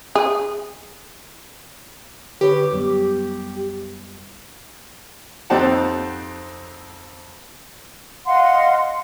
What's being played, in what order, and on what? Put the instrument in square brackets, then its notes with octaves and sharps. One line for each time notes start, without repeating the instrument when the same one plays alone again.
[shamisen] G#4
[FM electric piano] D3 B4 C#5 [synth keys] G4
[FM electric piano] F#2 G3 B3
[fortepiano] F2 C4 D#4 G4 F#5 A5
[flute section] D#5 F5 F#5 C6